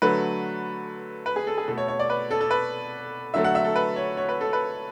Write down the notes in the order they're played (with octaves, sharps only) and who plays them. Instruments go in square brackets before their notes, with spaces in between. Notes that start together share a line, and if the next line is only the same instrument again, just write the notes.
[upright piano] D3 F#3 A3 B4
B4
G#4
A4
G#4
B2 A3 A4
C#5
C#5
D5
B4
A4
A4
B4
D3 F#3 A3 E5
F#5
E5
A4
B4
C#5
C#5
B4
A4
B4